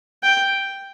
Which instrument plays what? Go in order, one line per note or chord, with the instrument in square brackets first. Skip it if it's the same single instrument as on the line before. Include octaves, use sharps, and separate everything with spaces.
[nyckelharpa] G5